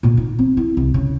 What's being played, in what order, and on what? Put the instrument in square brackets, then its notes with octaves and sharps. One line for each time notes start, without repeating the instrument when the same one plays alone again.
[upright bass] A#2 D3
D#4
C4
E4
C2
C#3